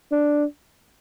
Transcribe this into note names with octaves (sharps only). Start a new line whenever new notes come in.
D4